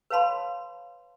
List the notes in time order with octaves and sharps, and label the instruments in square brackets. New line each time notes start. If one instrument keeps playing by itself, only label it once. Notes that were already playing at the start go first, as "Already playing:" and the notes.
[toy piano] B4 C#5 F5 A5 B5 C6